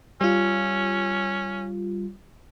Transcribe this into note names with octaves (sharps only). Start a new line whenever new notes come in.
G3 C#4 F4